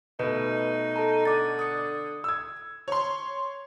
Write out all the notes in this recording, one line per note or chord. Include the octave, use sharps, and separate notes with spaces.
B2 A3 D#4 B4
A4 A5 A#5
D3 D6 A6
D#6 C#7
E6 G#6
C#5 C6